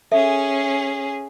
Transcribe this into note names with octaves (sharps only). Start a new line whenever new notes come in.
C#4 G#4 A4 E5